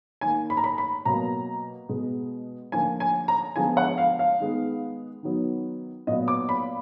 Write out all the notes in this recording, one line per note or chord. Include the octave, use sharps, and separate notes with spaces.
D#3 A#3 G#5
B5
A#5
B5
B5
B2 F#3 A#3 A#5
B2 G#3 B3
D3 F3 A#3 G#5
G#5
A#5
D3 F3 G#3 B3 G#5
F#5
F5
F5
D#3 G#3 B3
D#3 F#3 B3
A#2 F#3 B3 D#5
D6
B5